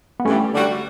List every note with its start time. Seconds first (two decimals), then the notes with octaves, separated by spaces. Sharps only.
0.20 B3
0.25 G2 E3 G3 A3 C#4
0.53 D3 G3 D4 F#4